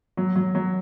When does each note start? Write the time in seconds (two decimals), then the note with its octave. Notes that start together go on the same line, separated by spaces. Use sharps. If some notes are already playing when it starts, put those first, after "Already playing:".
0.17 F#3
0.36 F#3
0.55 F#3